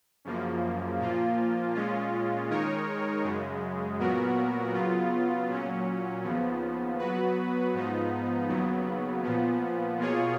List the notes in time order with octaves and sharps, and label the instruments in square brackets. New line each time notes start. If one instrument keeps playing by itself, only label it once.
[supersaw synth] F#2 C#3 F3 A#3
A#2 F3 A#3 F4
A#2 G#3 C#4 F4
D#3 G#3 D#4 A#4 C#5
F#2 C#3 G#3
A#2 F#3 B3 F#4 A#4
C#3 F#3 B3 F4
A#2 F#3 C#4
D#2 C#3 F3 B3
F#3 B3 F#4 B4
G#2 F3 B3 D#4
D#2 C#3 F#3 B3
A#2 F3 B3
B2 A#3 F4 G#4 C#5